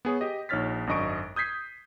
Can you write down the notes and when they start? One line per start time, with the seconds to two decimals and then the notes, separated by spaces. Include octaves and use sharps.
0.05 B3 G#4 C#5
0.21 G4 D#5
0.49 A#1 D#4 C#5 F6 A6 B6
0.87 G#1 F#2 D4 D#5 C#6 D7
1.36 D#6 G6 G#6 B6 C7